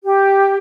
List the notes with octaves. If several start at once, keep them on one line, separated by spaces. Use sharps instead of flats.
G4